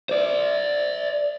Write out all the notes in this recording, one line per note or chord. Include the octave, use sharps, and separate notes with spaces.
C5 D5